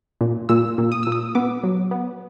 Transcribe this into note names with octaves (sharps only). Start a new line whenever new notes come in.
A#2
A#2 E6
A#2
D#6
A#2 E6
D#6
B3 D6
F#3
B3